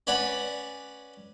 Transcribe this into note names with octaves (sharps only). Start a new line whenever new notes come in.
C#4 B4 D5 F#5 G#5